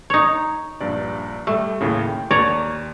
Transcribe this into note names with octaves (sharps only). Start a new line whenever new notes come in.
D#4 C#5
A#1 G2 D5
G3 A3
D#2 A2 C#3
G5
D#2 C#5 D5 A#5